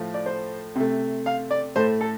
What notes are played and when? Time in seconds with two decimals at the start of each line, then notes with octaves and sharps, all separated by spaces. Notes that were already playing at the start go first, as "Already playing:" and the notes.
Already playing: A2 F3 A3
0.14 D5
0.26 C5
0.75 C3 A3
1.26 F5
1.51 D5
1.76 A2 A3 C5
2.01 A4